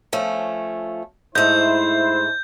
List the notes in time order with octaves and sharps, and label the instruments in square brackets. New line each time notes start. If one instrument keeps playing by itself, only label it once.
[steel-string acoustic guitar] F3 A3 C#4
[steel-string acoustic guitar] G#2 A3 [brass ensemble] E4 C5 [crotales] G6